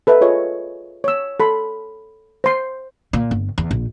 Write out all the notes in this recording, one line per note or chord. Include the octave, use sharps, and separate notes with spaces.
A4 B4 D#5 E5
F4 G#4 C#5 D#5 E5
C#5 E6
A4 B5 C6
C5 C6
A#2
G1
E2
A#1